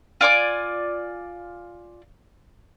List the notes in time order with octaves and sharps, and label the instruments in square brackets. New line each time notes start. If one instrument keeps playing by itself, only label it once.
[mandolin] F4 D5 G#5 D6